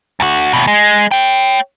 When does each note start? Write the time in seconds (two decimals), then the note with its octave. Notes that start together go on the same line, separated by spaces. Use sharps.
0.20 D2 F#4
0.53 D#2 B2
0.67 G#3
1.11 C#5 G5